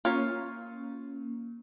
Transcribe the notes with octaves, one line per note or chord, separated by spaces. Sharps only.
A#3 C#4 F4 C#5